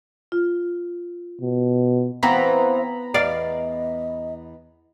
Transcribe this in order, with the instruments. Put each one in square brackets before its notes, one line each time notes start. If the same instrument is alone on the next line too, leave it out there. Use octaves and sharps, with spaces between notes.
[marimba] F4
[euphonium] B2
[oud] E3 C4 [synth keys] B3 A#5 B5 [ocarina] F5
[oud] E2 D5 F5 [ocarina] D#5